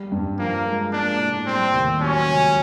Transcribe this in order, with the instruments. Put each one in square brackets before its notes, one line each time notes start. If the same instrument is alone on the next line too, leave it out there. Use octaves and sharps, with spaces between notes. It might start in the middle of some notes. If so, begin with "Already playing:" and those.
Already playing: [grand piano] G3
G2
[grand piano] F3 [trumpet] A#3
[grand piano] G#3
[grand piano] A#3 [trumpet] D4
[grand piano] A2
[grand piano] G3 [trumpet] C4
[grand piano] D#2
[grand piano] F#3 [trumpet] C#4
[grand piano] C#2